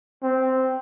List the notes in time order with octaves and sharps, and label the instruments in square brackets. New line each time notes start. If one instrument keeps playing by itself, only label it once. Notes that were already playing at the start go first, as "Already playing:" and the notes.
[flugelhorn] C4